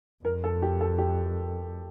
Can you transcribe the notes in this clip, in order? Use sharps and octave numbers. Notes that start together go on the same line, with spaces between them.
F2 A#4
A4
G4
A4
G4